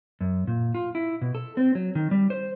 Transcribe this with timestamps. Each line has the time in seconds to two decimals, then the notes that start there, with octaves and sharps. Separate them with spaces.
0.21 F#2
0.47 A#2
0.75 F4
0.95 E4
1.21 B2
1.35 A4
1.57 C4
1.75 F#3
1.95 D#3
2.11 G3
2.30 C5